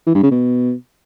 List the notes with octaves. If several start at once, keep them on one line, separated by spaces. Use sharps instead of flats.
E3
G2
C#3
B2